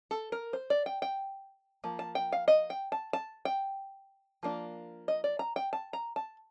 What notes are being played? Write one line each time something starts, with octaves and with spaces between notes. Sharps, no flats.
A4
A#4
C5
D5
G5
G5
F3 A#3
A5
G5
F5
D#5
G5
A5
A5
G5
F3 A#3 D4
D#5
D5
A#5
G5
A5
A#5
A5